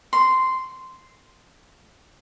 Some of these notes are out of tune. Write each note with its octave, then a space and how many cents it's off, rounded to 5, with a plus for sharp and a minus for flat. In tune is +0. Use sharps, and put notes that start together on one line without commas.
C6 -10